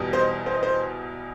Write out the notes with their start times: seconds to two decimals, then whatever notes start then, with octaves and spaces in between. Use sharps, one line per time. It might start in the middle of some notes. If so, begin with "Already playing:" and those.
Already playing: E2 B2 G3
0.13 C5
0.19 D#5
0.46 C5
0.54 D#5
0.63 C5